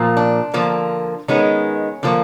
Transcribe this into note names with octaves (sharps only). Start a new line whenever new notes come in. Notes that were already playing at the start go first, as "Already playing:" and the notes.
Already playing: A#2 F3 A#3
D4
D3 F3 A#3
D#3 G#3 B3 C#4
D3 F3 A#3